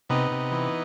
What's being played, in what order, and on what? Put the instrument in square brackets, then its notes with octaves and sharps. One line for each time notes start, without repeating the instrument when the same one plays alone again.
[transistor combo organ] C3 B3 D#4
C3
E3